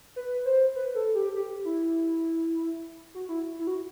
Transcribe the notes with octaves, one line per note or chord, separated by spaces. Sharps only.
B4
C5
B4
A4
G4
G4
E4
F#4
E4
E4
F#4